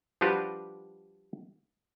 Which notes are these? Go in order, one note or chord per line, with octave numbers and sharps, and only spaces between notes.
F3 G3 D4 F#4 G4 B4